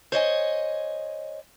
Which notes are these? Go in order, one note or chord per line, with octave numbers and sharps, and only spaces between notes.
C5 C#5 D#5 G#5